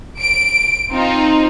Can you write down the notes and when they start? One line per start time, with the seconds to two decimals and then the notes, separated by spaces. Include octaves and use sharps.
0.21 D7
0.92 C4 D#4 F4